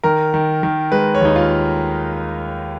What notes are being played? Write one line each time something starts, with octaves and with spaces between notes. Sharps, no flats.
D#3 A#4
D#3
D#3
G#3 B4
C#5
D#2 D#4
F4